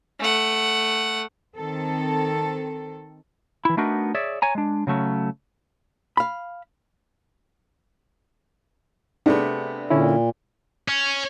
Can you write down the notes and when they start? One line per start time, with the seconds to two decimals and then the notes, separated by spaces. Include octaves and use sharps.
0.20 A3 F#5
1.56 D#3 C4 A4
3.65 E3 E4
3.77 A3 B3 D4 D#4 F#4 A#4
4.15 G#4 C#5 D5 E5
4.42 C#5 G#5 A#5
4.55 G#3 D4
4.87 C#3 F#3 A3 C#4
6.17 F5 B5
9.26 C3 A3 B3 D4 G#4
9.90 A#2 D3 C#4 E4
10.88 C#4